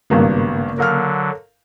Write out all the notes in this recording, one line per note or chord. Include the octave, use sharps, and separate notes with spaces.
G#1 G2 C#3 A#3 B3
D3 F#3 A#4 F5 F6